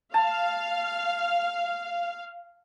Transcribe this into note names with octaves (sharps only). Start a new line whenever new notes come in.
F5 A5